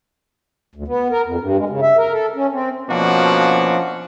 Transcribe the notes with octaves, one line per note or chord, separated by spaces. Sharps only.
D2
B3
A#4
F2
G2
G#3
C#3
E5
A#4
A4
C#4
C4
B2 F3 A#3 C#4 D4 F#4